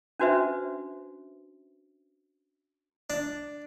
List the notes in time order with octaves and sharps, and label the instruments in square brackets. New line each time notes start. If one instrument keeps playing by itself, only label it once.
[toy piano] C#4 D4 F#4 B4 C5 E5
[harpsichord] D4